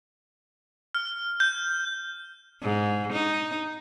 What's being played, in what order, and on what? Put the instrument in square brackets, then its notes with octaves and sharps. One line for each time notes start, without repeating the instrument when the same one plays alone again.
[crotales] F6
G6
[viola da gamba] G#2
D#4